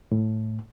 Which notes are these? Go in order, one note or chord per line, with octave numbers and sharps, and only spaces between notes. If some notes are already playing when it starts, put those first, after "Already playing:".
A2